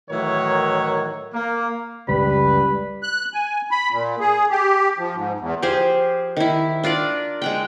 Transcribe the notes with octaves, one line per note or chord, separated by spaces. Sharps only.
A2 D#3 E3 F#3 A#4 C#5
A#3
F#1 C#2 G3 B4 B5
F#6
G#5
B5
A#2
G#4
G4
F3
G#2
E2
F3 G4 G#4 C5
D#3 E4
D4 F4 A#4 D5
G#3 F#5 G5